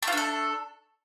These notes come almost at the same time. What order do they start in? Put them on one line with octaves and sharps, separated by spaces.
A3 F4 D4 A4